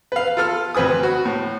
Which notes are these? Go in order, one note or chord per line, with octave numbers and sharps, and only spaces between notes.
B4 F5
F4 A4 F6
D2 C4 B4 G#5 D#6
F#4
A2